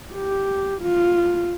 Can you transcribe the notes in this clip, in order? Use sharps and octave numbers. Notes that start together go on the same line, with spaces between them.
G4
F4